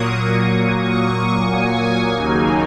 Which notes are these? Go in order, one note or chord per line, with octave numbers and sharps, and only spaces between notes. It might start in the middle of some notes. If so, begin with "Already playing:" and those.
Already playing: A#2 F#3 A#3 C#6 D#6
C#6
G#5
D#2 C#3 F#3 A#3 D#4